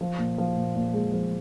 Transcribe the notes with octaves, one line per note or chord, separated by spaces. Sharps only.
F3
A#2
F3
A#2
A#2
G#3
F3